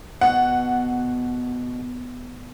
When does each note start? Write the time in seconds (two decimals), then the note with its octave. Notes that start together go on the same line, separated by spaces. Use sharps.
0.21 B2 F#5